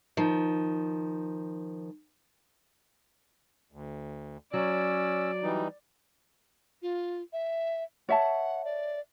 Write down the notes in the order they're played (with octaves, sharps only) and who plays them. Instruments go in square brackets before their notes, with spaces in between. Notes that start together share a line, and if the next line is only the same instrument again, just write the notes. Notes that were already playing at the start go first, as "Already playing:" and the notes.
[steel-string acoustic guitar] D#3 F3
[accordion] D2
[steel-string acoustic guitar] F#3 [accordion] C#4 E6 [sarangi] D5
[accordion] E3 G3 D#4
[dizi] F4
E5
[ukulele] C#5 E5 A5 [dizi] F#5
[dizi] D5